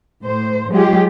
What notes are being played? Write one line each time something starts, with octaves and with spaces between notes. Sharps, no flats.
A2 C5
F#3 G#3 F4 G4 G#4